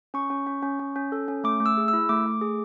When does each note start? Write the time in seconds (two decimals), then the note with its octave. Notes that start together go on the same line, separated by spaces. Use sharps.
0.14 C#4 C#6
0.30 C#4
0.47 C#4
0.63 C#4
0.79 C#4
0.96 C#4
1.12 A4
1.28 C#4
1.44 A3 D6
1.60 A3
1.66 E6
1.77 G#4
1.88 E6
1.93 E4
2.09 A3 D6
2.26 A3
2.41 G#4